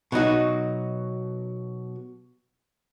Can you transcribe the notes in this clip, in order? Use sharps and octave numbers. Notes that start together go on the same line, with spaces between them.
B2 F#3 D#4 F#4